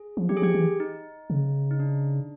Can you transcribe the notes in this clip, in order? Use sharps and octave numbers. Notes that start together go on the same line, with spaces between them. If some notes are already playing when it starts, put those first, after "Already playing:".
Already playing: G#4
F3
F#3 G4
G#4
F3 G4
E3
D#4
C#3
D#4
D4